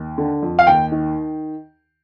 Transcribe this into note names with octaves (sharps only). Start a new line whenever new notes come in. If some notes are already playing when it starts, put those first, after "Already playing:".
Already playing: D#2
D3
F2
F5
D#2 G5
D#3